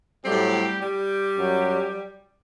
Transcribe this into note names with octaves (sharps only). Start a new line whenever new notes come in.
A2 F#3 G3 A3 C4 G4
G3 G4
F#2 F#3